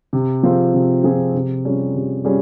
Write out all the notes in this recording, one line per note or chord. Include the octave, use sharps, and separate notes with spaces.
C3
F3 C4 F4 G#4
C3
F3 C4 F4 G#4
C3
G3 C#4 F4 G#4
C3
G3 C#4 F4 G#4